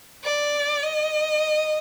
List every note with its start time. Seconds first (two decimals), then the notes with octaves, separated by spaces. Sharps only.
0.24 D5
0.83 D#5